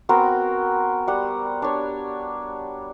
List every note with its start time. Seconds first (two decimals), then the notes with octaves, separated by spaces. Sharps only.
0.09 B3 C4 F#4 A#4
1.07 G3 F#5
1.62 D4 C#5